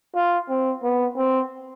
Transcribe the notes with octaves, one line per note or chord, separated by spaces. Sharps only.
F4
C4
B3
C4